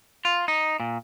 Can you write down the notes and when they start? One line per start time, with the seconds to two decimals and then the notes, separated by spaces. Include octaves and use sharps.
0.25 F4
0.48 D#4
0.80 A#2